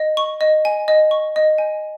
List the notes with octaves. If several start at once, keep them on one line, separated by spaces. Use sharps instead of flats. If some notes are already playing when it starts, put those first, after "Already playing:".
Already playing: D#5
C#6
D#5
G#5
D#5
C#6
D#5
G#5